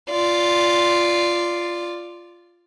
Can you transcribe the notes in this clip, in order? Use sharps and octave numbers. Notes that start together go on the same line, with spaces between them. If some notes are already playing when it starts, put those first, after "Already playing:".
F4 D5